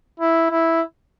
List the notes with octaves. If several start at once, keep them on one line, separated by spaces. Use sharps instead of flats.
E4
E4